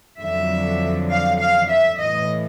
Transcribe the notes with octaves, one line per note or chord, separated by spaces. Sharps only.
F2 D3 F#3 E5
F5
F5
E5
A2 E3 D#5